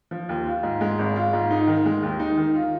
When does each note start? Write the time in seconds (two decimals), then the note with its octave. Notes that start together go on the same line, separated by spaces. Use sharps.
0.11 F3
0.29 D#2
0.45 F4
0.63 G#2
0.81 G#3
0.99 G#1
1.16 F4
1.33 G#2
1.51 D#4
1.67 D#3
1.86 G#3
2.03 D#2
2.19 D#4
2.37 D#3
2.55 F4